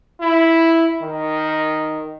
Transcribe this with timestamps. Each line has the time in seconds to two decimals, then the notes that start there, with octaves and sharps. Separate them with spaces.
0.20 E4
1.02 D#3